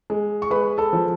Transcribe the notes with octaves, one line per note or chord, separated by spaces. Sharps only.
G#3
C#6
G#3 B4 B5
A4 A5
F3